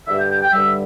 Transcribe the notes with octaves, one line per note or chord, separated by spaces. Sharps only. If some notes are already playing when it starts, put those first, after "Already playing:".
G2 D3 G3 E5
G5
G5
G5
G2 D3 G3 E5